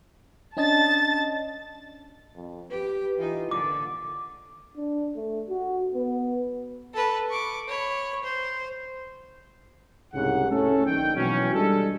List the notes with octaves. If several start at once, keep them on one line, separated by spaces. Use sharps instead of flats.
C#4 D4 D#5 A5 A6
F2
G4 B4
E3 D#4 F4
A#2 D3 D6
D4
A3
F#4
B3
A4 B4
C#6 D6
C#5 B5
C5
C2 G#2 C#3 F#5
A3 C#4 A4
A#1 D3 D#3 G5
B2 E3 F#3 C#4
G3 G#3 D4 A4